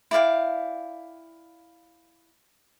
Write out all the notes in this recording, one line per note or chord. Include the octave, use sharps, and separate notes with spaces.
E4 D5 F5 G5